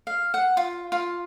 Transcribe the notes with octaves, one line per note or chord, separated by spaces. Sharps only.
F5
F#5
F4
F4